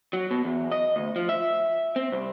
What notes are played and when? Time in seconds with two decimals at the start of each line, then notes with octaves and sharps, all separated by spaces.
0.13 F#3
0.31 B2
0.44 E2
0.72 D#5
0.96 D2
1.16 F3
1.29 E5
1.96 C4
2.12 C2